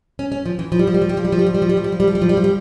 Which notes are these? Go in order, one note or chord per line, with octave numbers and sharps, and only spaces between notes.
C#4
C#4
F3
E3
F3
G3
F3
G3
F3
G3
F3
G3
F3
G3
F3
G3
F3
G3
F3
G3
F3
G3
F3
G3
F3
G3
F3
G3